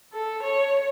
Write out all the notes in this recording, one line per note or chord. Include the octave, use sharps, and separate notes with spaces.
A4
C#5